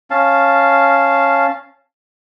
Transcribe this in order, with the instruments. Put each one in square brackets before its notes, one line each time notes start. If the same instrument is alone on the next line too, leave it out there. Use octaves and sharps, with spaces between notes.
[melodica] C#4 F5 A5